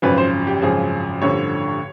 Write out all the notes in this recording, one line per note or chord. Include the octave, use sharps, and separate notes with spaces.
G#1 F#2 C#3 F3 B4
C5
G4
G#1 F#2 C#3 F3 G#4
A1 G2 D3 F3 C#5